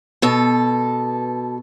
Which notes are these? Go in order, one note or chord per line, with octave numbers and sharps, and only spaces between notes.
B2 A4